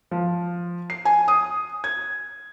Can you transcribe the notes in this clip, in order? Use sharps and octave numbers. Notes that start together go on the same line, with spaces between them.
F3
C7
G#5
D#6
G#6